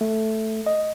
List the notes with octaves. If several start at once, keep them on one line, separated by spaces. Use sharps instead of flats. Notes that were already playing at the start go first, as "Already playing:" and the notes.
A3
D#5